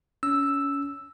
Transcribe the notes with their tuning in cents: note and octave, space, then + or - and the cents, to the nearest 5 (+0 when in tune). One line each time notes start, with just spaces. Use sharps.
C#4 +25 E6 +0